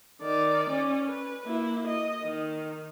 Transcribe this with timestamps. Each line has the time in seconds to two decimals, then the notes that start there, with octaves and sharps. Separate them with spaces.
0.21 D#3 D5
0.70 C#4
1.09 B4
1.45 A#3 E4
1.88 D#5
2.24 D#3